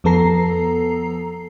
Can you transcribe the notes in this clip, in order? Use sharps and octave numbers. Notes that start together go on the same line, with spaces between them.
F2 F3 B3 A4 A#5 C7